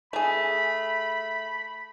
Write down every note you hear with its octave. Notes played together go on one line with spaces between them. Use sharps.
A3 G#4 B5